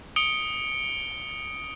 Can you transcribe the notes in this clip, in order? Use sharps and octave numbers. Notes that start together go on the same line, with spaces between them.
D#6 C#7 D7 G7